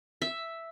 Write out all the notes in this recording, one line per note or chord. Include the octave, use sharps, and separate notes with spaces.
E5